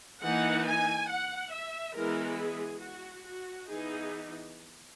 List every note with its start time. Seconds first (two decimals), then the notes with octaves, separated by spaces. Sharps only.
0.22 E3 A#3 D#4 F#5
0.66 G#5
1.09 F#5
1.52 E5
1.95 E3 G#3 B3 E4 A#4
2.39 G#4
2.82 F#4
3.25 F#4
3.68 E3 B3 D#4 G#4